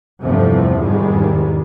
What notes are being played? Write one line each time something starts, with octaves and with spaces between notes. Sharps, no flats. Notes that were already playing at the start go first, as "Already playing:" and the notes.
E2 G2 C3 F3 A3 C4
F1 E2 G#2 D#3 G3 G#3